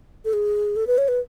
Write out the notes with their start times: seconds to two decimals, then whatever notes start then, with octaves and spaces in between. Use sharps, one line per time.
0.25 A4
0.33 G#4
0.76 A4
0.87 B4
0.98 C#5
1.08 B4